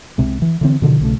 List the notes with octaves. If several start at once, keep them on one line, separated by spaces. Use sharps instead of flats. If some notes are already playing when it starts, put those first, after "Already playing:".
C2 C3 G#3
E3
D3 E3 C4
B2 D3 D#3 F3
B1 C#3 A3